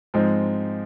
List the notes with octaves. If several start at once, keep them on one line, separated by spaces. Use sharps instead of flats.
G#2 F3 G#3 C4 D#4